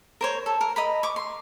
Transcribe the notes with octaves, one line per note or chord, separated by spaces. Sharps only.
A#4 C5 C#5
A4
A#4
D#5 A#5 B5
C#6 D6
C6